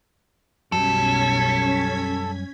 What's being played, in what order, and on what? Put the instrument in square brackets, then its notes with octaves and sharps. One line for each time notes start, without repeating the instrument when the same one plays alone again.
[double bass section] B1 [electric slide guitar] F#2 F#3 G3 [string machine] C#4 G#6 B6 [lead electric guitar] A4